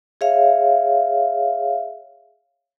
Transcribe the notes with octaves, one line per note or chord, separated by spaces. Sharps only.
G#4 C#5 E5 F5